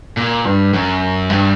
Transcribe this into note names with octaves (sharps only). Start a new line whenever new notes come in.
A#2
G2
F#2
G2